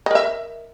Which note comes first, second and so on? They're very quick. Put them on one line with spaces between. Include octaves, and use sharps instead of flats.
D#5 A#4 E5